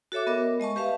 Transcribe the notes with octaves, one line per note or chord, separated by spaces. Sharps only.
F#4 A4 C#5 E5 D6
B3 A#4 D#5 E5
G#3 D#5 A5 C#6
G4 B4 E5 F5 A5